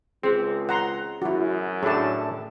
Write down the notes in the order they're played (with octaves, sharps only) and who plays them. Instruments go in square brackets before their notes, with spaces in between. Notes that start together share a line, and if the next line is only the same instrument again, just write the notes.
[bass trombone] C#2 [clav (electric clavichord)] C4 [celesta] G#4 C5
[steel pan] F#5 A#5 C6
[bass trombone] F#2 [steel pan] E4 F#4
[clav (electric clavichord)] A2 A3 D4 [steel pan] G#4 A5